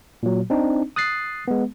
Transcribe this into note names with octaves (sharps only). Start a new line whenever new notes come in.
A#2 F#3
C4 D4 D#4
D#6 F#6 A6 C7
G#3 B3